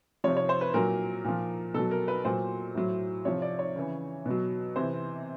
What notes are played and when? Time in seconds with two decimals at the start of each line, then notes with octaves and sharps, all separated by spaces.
0.24 C3 F3 C#5
0.37 C#5
0.49 C5
0.61 B4
0.74 A#2 F#3 A#4
1.24 A#2 F3
1.74 B2 F#3 A4
1.91 A#4
2.08 B4
2.25 A#2 F#3 C5
2.75 A2 F#3
3.25 C3 F3 C#5
3.42 D5
3.59 C#5
3.76 C#3 E3
4.26 B2 F#3
4.76 C3 E3 C5